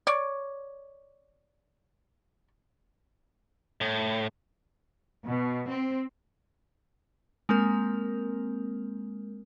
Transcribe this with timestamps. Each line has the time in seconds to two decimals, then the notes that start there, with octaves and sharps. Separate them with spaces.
0.07 C#5 D5
3.81 A2
5.26 B2
5.70 C4
7.49 G#3 A#3 C4 A#4